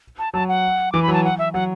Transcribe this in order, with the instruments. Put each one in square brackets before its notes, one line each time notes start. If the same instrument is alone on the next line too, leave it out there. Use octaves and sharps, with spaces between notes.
[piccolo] A5
[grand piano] F#3 [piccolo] A5
[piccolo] F#5
[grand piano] E3 [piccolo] D6
[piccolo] B5
[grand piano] F#3 [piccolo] A5
[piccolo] F#5
E5
[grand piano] F#3 [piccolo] F#5